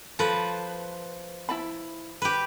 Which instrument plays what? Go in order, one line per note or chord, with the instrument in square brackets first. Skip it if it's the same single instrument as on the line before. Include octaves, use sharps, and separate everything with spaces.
[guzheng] F3 B4 [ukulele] A4
[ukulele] E4 A5 B5
[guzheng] G4 B4